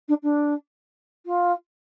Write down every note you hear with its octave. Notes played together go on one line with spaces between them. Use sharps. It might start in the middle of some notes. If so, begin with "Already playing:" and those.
D4
D4
F4